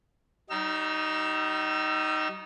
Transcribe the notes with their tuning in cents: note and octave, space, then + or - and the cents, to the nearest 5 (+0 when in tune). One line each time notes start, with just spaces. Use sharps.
G3 -40 D#4 +0 E6 +35